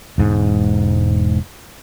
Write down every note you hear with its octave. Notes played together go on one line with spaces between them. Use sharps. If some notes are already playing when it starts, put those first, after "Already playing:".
E1 G#2